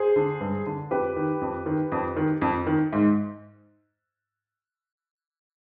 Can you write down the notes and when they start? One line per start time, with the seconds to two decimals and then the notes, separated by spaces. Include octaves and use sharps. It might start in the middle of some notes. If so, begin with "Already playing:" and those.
Already playing: G#4 C5
0.16 D3
0.40 G2
0.67 D3
0.91 F2 G4 B4
1.16 D#3
1.41 F2
1.66 D#3
1.92 F2
2.17 D#3
2.42 F2
2.67 D#3
2.93 G#2